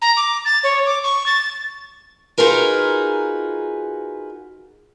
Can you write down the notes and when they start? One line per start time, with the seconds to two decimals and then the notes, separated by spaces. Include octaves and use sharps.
0.02 A#5
0.17 D6
0.45 A6
0.64 C#5
0.86 D6
1.04 C#6
1.26 A6
2.38 D#4 F4 F#4 G#4 A#4 B4